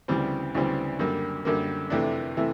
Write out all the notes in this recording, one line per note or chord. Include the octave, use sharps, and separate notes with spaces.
D2 C#3 E3 G3 C4
D2 C#3 E3 G3 C4
F#2 D3 G3 A#3
F#2 D3 G3 A#3
F2 C3 E3 A3 D4
C3 E3 A3